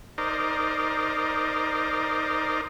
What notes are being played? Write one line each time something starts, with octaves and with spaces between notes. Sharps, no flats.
D#4 A#4 C5 D5